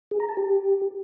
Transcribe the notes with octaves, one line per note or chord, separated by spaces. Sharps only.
G#4
A#5
A5
G4